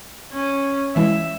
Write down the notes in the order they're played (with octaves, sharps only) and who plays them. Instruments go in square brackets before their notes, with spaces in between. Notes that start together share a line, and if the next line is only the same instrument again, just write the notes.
[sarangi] C#4
[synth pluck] E3 G#3 E4 [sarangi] E5